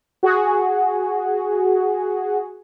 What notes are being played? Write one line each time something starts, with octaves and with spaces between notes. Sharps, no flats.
F#4 G#4